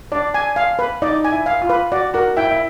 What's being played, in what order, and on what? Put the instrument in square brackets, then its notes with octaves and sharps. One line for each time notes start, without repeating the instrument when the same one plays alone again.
[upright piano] D4 [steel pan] D5
[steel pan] G#5
F5
B4
[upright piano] D#4 [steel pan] D5
[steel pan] G#5
[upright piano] E4
[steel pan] F5
[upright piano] F4
[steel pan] B4
[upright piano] F#4 [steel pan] D5
[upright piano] F#4 [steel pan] A#4
[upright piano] E4 [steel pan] G5
[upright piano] E4